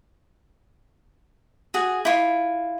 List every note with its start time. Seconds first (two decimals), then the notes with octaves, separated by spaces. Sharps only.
1.74 F#4 G#4
2.05 E4 F4